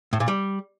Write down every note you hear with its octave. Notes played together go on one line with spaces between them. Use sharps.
A2
A#2
G3